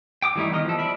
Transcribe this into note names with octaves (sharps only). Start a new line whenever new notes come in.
G5 D6 D#6
E3 G3 A3 D#4 E4
D#3 B3 A#4 D#5
F3 A4
D5 E5 B5